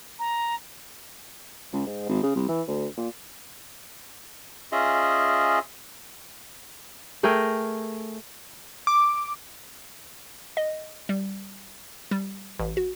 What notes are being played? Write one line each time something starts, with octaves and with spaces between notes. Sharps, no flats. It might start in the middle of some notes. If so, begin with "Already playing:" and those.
A#5
C#2
G#2
G#1
C#3
C2
E3
D2
A#2
C#4 F4 G#4 D#5 E5
A3 G#4 A#4 G5
D6
D#5
G3
G3
A1
F#4